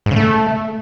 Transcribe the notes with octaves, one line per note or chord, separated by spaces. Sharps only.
G#2
C#3
A3